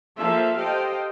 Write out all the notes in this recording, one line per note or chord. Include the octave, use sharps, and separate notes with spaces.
F3 A#3 A4 C5 E5 F5
G4 A4 C5 D#5 F5 G5